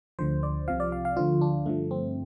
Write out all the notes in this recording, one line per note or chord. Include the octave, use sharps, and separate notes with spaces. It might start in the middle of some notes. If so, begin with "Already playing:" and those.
D2 D3 F3 C5
D5
C2 C3 F3 F5
D5
F5
F5
D2 D3 F3 F4
D4
G2 D3 F3 A3
C4